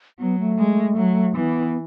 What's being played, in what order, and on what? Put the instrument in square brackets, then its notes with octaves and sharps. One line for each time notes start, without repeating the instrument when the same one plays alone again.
[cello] F#3 [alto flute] B3
[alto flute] A3
[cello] G#3
F#3
[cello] E3 [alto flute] B3